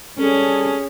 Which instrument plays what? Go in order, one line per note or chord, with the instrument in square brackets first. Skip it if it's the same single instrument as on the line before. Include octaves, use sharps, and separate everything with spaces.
[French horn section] G3 A4 [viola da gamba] C#4 [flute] G#4